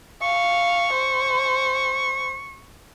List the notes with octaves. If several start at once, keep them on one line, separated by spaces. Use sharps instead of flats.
F5 C#6
C5